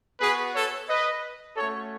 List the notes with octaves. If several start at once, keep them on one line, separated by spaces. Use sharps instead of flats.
B3 F#4 G#4 B4
A4 C#5
B4 D#5
A3 C#4 F#4 A4 C#5